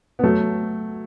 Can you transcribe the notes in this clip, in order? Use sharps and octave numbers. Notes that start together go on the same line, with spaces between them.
B3
F#3 A3